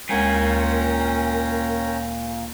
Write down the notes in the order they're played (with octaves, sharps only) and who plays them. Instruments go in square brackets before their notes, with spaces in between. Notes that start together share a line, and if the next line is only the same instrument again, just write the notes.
[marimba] D2 G#3 [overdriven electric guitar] A#2 G#5 [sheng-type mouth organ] C#4 G5 A#5 [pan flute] A#4